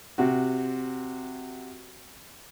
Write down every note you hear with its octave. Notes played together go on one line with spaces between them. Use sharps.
C3 F#4